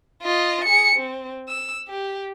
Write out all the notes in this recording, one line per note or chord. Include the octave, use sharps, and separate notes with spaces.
F4 D#5
G#4 C#7
C4
E6
G4